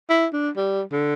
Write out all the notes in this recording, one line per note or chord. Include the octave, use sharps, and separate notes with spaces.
E4
D4
G3
D3